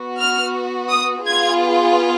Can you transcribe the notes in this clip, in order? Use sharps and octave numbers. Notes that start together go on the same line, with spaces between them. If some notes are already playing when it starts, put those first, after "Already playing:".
Already playing: B3 F#4
F6
D#6
B3 F4 G#4 G#6